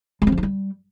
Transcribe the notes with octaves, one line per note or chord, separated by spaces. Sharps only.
G#3
C4
F3
D#4
G3